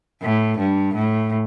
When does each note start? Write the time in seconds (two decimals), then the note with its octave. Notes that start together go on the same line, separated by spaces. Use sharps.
0.22 A2
0.59 G2
0.95 A2